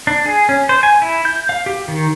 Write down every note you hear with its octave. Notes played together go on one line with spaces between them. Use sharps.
D4
G#4
C#4
C5
G#5
E4
G6
F5
G4
D#3